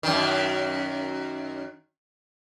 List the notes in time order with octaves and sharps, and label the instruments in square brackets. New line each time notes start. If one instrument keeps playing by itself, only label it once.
[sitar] F#2 D#3